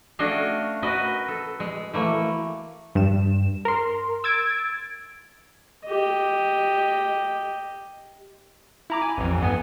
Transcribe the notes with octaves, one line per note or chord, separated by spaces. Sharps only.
A3 C#4 D4 F#4 D#5 F5
F#4 A#4 B4 D#5
A4
G#3
E3 A3 A#3
G2 E7
A#4 C6
E6 G#6 A6 D7
G4 D#5
E4 A#5 D6
G#5
A1 F2
G2 B3 G#5